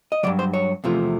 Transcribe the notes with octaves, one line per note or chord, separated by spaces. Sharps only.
D#5
G2 D#3 F#3 D5
C5
C#5
E2 C3 F3 A3